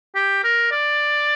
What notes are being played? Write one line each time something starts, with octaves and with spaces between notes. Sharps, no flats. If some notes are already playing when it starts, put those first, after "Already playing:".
G4
A#4
D5